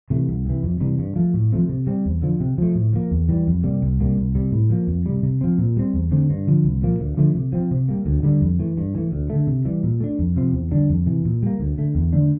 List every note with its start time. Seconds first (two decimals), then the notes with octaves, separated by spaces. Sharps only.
0.10 C3 E3 A3
0.28 C2
0.45 C3 E3
0.63 F2
0.80 C3 E3 G3
0.99 G2
1.16 F3 A3
1.34 A2
1.52 F3 A3 C4
1.69 C3
1.87 G3 C4
2.05 E2
2.22 D3 F3
2.40 C3
2.58 F3 A3
2.75 A2
2.93 F3 A#3
3.11 E2
3.29 E3 G3
3.47 F2
3.63 C3 G3 A#3
3.82 C2
4.00 C3 G3 A#3
4.17 C2
4.35 C3 G3
4.52 A2
4.70 F3 A#3
4.87 F2
5.06 C3 G3
5.23 C3
5.41 F3 C4
5.58 A#2
5.77 G3 C4
5.94 E2
6.11 D3 A3 C4
6.30 G2
6.47 D3 F3
6.64 C2
6.82 A#2 F3 A#3
7.00 D2
7.17 D3 F3 A3
7.35 C3
7.52 F3 C4
7.71 C3
7.88 G3 A#3
8.06 D2
8.23 D3 G3
8.41 F2
8.59 E3 A3
8.78 G2
8.95 E3 A3
9.12 D2
9.30 D3 A3
9.47 C3
9.65 E3 G3
9.83 A#2
10.00 A3 D4
10.19 F2
10.36 C3 F3 C4
10.53 E2
10.71 D3 G3 D4
10.89 F2
11.06 C3 E3
11.25 A#2
11.43 G3 A#3
11.60 D2
11.78 D3 A3
11.95 E2
12.13 D3 A3 D4